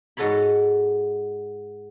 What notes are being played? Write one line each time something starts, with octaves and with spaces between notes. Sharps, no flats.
G#2 G#3 F#4 A4 C#5 B5